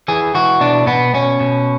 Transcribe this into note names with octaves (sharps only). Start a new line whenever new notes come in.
E3 G#4
E3 F#4
B2 D4
B2 B3
B2 C#4
B2